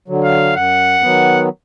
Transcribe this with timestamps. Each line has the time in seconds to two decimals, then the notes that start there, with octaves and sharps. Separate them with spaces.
0.08 D3 F#3
0.23 F5
0.55 F#2 F#5
1.02 D#3 F#3 B3